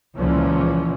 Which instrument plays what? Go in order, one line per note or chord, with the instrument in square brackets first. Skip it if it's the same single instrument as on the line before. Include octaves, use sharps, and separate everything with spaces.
[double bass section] C#2 A#2 E3 F3 C#4